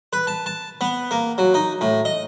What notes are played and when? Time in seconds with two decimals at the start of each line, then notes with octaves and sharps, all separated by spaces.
0.13 B4
0.27 A5
0.46 A5
0.81 B3
1.11 A#3
1.38 F#3
1.54 D#4
1.81 A2
2.05 D#5